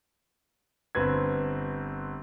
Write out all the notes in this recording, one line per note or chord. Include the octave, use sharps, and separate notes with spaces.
G1 C4 B4 G#6